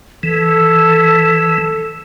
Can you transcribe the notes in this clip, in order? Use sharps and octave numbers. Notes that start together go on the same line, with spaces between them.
E3 A4